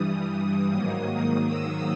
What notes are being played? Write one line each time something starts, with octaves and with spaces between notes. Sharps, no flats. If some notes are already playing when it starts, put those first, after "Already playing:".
Already playing: G2 E3 G3 D#6
G#2 D#3 F#3 A#3
E6